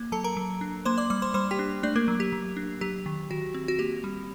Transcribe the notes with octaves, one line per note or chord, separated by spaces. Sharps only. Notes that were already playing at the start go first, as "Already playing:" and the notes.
Already playing: A#3
F#3 A4 A5
A#4 A#5
F#3
D4
A#3 C5 C6
D5 D6
G3 D5 D6
C5 C6
G3 C5 C6
G4 G5
D4
A3 D4 D5
A#3 A#4
F#3
G4
F#3
D4
F#3 G4
D#3
D#3 F#4
C4
F#4
A#3 G4
G3